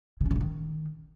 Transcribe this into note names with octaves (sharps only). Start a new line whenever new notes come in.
C#3
C#4
D3
C#3
D#3